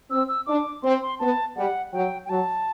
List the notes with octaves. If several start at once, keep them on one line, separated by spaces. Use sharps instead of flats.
C4 E6
E6
D4 D6
C4 C6
C6
B3 A5
G3 F#5
F#3 G5
G5
F#3 A5